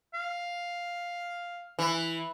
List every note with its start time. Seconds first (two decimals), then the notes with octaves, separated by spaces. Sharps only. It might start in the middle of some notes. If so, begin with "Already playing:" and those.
0.14 F5
1.79 E3